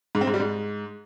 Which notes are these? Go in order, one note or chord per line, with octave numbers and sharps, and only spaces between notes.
G#2
C4
G#2
G3
G#2